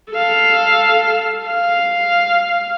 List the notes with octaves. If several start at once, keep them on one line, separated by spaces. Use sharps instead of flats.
A4 F5
F5